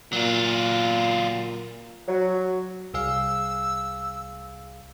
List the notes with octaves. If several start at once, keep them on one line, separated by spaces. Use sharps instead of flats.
A#2 F#3 F4
F#3
C2 G#4 F5 E6